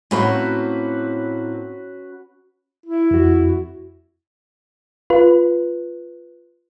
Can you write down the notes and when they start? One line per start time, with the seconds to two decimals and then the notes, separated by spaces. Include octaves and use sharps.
0.11 A2 A#3 C4 C#4 F#4 B4
2.86 E4
3.11 F2 F#4
5.10 F4 B4